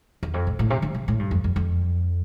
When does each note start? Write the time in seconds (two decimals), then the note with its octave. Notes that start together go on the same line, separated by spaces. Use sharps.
0.23 E2
0.34 F2
0.47 A2
0.59 A2
0.70 C3
0.82 D3
0.95 C3
1.08 A2
1.19 G2
1.31 F2
1.44 F2
1.56 F2